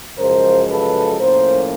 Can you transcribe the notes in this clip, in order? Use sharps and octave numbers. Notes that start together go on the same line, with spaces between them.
F#2 C#3 F3 G#3 A#4 C5
A4 B4
A2 F3 A#3 C#4 A#4 C5